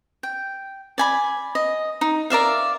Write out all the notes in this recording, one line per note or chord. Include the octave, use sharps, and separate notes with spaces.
G5
D5 G#5 B5
D#5
D#4
A#4 D5 E5 F5